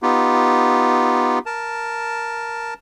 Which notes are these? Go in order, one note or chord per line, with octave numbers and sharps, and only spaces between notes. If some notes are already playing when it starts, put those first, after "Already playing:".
B3 D#4 F4 G4
A#4 A5